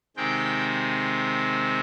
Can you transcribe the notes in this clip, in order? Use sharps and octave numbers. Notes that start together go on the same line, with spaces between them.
C3 D#3 G#3 C4 G5